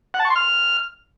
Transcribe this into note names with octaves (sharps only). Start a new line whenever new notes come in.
F#5
A5
C#6
C6
F6